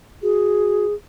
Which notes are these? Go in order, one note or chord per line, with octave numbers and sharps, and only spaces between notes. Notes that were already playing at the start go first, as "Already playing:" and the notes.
F#4 G#4